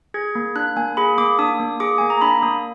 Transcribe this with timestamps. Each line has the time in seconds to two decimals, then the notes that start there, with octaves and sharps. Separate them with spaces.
0.14 G#4 G#6
0.35 A#3
0.56 D4 F#6
0.76 A#3 G#5
0.97 G#4 B5
1.18 A#3 D6
1.39 D4 D#6
1.60 A#3
1.80 G#4 D6
1.98 A#3 G#5
2.10 A#5
2.21 D4 B5
2.42 A#3 D#6